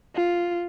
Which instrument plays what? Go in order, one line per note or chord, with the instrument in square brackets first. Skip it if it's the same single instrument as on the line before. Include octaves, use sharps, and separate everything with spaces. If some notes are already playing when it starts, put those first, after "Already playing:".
[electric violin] F4